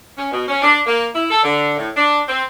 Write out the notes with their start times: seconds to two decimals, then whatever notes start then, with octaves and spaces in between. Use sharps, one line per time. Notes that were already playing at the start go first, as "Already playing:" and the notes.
0.17 C#4
0.32 B2
0.48 C#4
0.62 D4
0.86 A#3
1.14 E4
1.29 A4
1.43 D3
1.77 A2
1.96 D4
2.28 C4